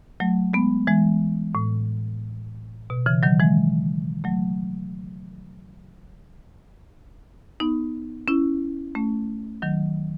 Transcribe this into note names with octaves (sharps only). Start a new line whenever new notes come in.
F#3 A3
G#3 B3
E3 G#3
A2
B2
C#3 E3
D#3 F#3
E3 G#3
F#3 A3
B3 D#4
C#4 E4
A3 C#4
D#3 F#3